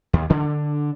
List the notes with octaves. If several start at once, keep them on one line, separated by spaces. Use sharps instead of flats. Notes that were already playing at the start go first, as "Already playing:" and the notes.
D#2
D3 D4